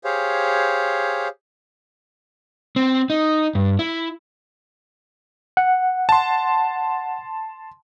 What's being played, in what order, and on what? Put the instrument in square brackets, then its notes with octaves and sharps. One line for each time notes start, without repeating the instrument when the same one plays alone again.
[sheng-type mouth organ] G4 G#4 C5 C#5 F5
[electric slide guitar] C4
D#4
G2
E4
[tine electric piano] F#5
[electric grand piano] A5 C6